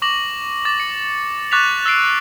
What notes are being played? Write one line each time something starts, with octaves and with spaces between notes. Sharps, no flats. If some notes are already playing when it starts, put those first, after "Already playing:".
C#6 D6 A#6 F#7
D6 A6
C#7
C#6 D6 F#6 A6 B6 F7
E6 A6 C7 D7